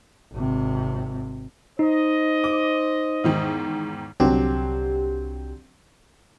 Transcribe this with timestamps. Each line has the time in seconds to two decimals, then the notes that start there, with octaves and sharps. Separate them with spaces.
0.33 G#1 C3
1.79 D#4 C5 D#5
2.44 D6
3.24 E2 G#2 D#3
4.20 C2 D3 F#3 C4 G4